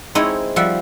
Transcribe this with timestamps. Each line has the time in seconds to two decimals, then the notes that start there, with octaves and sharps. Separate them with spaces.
0.15 G#3 C4 D#4 E4 C#5 D#5
0.56 F3 G3 E5 F#5